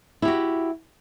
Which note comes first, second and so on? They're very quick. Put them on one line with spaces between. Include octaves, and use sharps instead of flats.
E4 G4 F#4